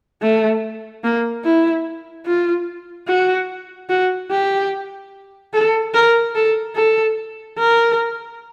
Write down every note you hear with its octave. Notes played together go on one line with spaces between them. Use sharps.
A3
A#3
E4
F4
F#4
F#4
G4
A4
A#4
A4
A4
A#4